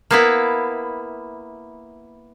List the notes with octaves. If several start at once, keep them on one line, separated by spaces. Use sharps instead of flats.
A#3 B3 E4